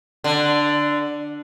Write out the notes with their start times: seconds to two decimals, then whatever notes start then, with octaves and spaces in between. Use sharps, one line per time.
0.24 D3